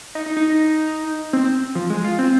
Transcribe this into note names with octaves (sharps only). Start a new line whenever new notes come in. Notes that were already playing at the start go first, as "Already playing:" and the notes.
D#4
D#4
D#4
C4
F3
G#3
F4
C4